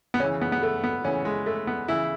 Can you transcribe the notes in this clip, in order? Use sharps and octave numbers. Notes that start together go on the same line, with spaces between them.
B3
C#3 E3 C#4
B3
B3
A3
B3
C#3 E3 C#4
G#3
A3
B3
C#3 E3 E4